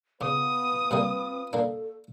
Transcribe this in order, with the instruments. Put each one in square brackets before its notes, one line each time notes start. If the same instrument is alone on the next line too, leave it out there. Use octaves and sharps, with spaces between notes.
[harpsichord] C#3 [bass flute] B3 [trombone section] F4 B4 [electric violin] D#6
[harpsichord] C3 G3 A#3 [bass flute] C4
[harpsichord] A#3 D4 [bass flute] A4